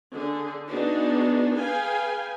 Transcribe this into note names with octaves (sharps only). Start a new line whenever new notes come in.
D3 G#4
B3 D4 D#4 F#4 G#4
G#4 B4 F5 G5 G#5